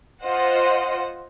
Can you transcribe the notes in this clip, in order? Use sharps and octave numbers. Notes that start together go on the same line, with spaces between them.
F4 C5 D#5 F#5